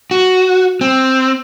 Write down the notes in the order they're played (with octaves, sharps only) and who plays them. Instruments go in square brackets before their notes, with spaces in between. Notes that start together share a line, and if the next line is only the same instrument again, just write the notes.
[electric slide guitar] F#4
C4